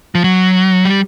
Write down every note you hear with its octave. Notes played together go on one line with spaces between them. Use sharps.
F3
F#3
G3